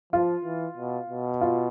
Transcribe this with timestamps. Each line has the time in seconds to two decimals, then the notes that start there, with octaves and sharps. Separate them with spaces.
0.13 F3 F4
0.45 E3
0.77 B2
1.10 B2
1.41 F4